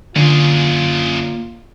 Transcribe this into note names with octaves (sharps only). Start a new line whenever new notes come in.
F#2 D3 A#3 F4 G#4 D5